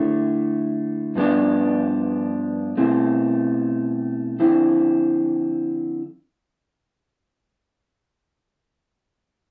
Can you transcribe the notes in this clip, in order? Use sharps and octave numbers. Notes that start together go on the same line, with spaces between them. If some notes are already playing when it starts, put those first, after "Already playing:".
Already playing: D3 A3 E4
G2 F3 B3 D4
B2 A3 C4 E4
D3 F3 C4 E4